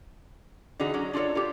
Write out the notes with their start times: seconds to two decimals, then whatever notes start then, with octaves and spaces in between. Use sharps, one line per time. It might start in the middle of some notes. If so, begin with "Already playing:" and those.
0.80 D3 E3 D#4 F#4 G#4
0.93 D3 F#3 C#4
1.13 D4 F4 F#4 A4 C#5
1.35 F4 G4